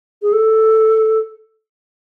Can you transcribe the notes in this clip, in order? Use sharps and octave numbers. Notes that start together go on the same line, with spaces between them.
G#4
A4